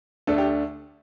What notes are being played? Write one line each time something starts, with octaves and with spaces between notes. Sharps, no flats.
D2 D3 A3 D4 A4
G4